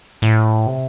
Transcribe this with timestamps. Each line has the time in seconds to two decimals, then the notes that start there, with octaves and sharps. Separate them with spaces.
0.22 A2
0.67 C3